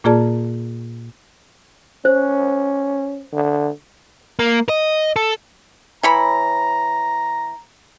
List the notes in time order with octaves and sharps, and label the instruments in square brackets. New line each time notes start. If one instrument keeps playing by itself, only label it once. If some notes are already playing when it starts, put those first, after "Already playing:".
[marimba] A#2 A#3 F4 G#4 D5 A5
[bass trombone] C#4 [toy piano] C5
[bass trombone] D3
[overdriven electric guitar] A#3
D#5
A4
[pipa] E3 C#5 B5 [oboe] A#5